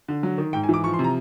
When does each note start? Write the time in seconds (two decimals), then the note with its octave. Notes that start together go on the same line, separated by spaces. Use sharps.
0.08 D3
0.23 F#3
0.38 D#3
0.53 G#2 G5
0.64 G#5
0.69 E3 D6
0.84 F3 C#6
0.94 C6
0.99 C3
1.04 A#5